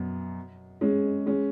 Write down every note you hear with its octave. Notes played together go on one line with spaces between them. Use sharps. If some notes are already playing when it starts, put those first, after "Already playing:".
Already playing: F#2 B2
G#3 C#4
G#3 C#4